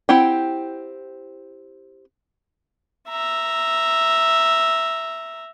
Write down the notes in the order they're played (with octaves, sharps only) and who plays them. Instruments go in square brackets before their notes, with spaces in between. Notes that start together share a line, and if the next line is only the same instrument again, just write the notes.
[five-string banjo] C4 E4 G4 F#5 G5
[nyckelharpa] E5 A#5